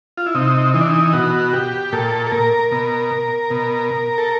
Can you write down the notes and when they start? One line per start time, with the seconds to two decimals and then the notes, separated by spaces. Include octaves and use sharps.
0.17 F4
0.26 E4
0.35 C3 D#4
0.74 E3 D#4
0.81 D4
0.89 D#4
1.13 B2 F#4
1.53 G4
1.92 A#2 A4
2.27 A4
2.32 A#4
2.71 B2
3.51 B2
4.18 A4